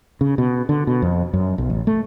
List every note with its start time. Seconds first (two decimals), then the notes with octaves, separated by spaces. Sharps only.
0.21 C#3
0.38 B2
0.69 D3
0.87 B2
1.02 F2
1.33 F#2
1.58 B1
1.70 A1
1.87 A3